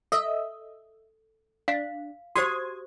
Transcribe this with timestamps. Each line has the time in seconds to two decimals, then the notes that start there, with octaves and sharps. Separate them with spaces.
0.12 A4 D#5 E5
1.68 D4 F5
2.36 F#4 G4 C5 C6 D#6 G#6